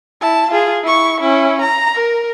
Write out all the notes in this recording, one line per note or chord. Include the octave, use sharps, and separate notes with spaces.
E4 A5
F4 G#4
E4 C#6
C#4 E4
A#5
A#4